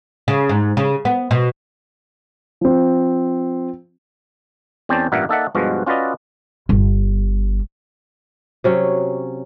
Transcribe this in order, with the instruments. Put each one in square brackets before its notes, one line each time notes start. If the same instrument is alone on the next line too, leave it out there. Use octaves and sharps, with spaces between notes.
[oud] C#3
G#2
C#3
B3
B2
[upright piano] F3 C4
[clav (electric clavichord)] E2 C4 C#4 C5 D5 A5
A1 G2 A#2 A#4 E5 F#5
A#3 D#4 A4 D5 E5 F#5
G2 B2 F3 G#3 F#4
C#4 F4 F#4 B4 D5 D#5
[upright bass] G1
[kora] C3 F#3 C#4